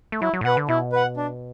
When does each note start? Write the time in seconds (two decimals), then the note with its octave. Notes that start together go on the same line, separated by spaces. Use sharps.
0.12 A3
0.22 F#3 E4
0.33 F#3
0.41 A2
0.45 B2 B4 F#5
0.57 D3
0.68 B2 E4
0.92 B4 F#5
1.17 D4